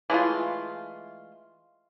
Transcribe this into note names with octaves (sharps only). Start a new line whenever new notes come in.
E3 G#3 A3 F4